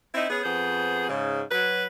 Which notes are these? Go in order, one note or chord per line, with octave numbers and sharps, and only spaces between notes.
C4 D#4 E4
B3 C#4 G#4
F2 B3 G#4 C5
G#2 C#3
F#3 B4